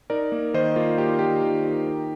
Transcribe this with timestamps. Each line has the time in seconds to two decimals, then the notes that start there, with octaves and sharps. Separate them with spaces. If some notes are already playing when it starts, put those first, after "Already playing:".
0.10 D#4 A#4 D5
0.32 A#3
0.54 D#3 C5 D#5
0.76 A#3 F4
0.98 D#4 G4
1.09 F4
1.19 D#3 G4
1.42 D#3
1.65 D#4
1.87 D#4